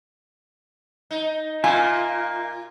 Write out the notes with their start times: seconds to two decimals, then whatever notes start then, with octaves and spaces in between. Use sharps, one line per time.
1.11 D#4
1.64 A#2 A#3 F4 E5 G#5